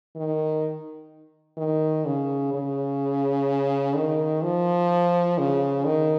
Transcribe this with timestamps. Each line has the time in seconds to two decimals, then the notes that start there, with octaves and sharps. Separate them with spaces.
0.16 D#3
1.57 D#3
2.06 C#3
2.53 C#3
3.95 D#3
4.43 F3
5.38 C#3
5.85 D#3